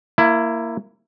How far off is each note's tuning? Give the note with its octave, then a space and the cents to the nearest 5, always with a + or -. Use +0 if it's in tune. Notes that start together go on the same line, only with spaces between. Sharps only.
A#3 -10 E4 +15